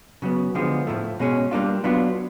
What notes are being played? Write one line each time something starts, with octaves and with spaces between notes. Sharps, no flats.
C#3 F#3 B3
D3 F3 G#3 B3
A2 F3 A3
B2 G#3 C#4
G3 A#3 D4 F4
F#3 B3 D4 F4